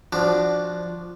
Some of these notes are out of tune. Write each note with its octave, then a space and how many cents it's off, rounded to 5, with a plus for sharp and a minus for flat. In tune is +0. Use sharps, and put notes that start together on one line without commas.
F3 -5 D4 +0 F#4 +0